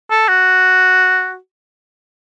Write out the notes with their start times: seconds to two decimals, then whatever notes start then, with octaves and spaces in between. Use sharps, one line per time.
0.10 A4
0.28 F#4